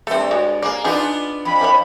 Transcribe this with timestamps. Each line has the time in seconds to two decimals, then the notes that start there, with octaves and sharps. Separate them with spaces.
0.07 G2 A3 C4 A4
0.31 G#3 F#4 C#5
0.62 A#3 G#4 D5
0.84 B3 D4 D#4 F4 G#4
1.45 F2 B5
1.61 F3 B4 C#5